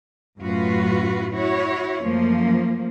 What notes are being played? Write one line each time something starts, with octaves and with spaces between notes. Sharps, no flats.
F#2 A2 F4 F#4 B4
E4 F#4 C#5
F#2 F3 A3 A#3